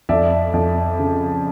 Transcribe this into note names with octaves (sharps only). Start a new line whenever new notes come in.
F2 D5 E5
F2
C#3